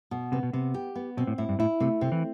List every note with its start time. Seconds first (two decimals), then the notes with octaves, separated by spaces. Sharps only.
0.11 B2
0.32 C3 B3
0.43 B2
0.53 C3 B3
0.74 G4
0.95 B3
1.17 B2 C4
1.27 A2
1.38 A2 E4
1.49 G2
1.59 A2 E4
1.80 C3 A3
2.01 C3 C4
2.12 E3